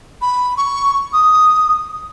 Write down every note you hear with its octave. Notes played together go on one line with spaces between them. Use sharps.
B5
C#6
D#6